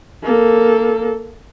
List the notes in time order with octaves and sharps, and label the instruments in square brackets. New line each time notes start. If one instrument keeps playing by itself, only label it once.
[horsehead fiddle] A#3 A4